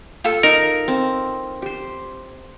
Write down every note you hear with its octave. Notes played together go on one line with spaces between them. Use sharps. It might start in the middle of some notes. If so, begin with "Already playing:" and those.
F4 A4
D#4 A#4
C4
G4 C5